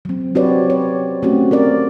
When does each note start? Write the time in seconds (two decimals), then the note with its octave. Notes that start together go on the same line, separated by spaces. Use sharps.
0.05 F#3 C4
0.35 C4 F#4 G4 B4 C#5 D5
0.70 C#5
1.22 A3 C4 C#4 F#4 G4
1.51 C4 A#4 D5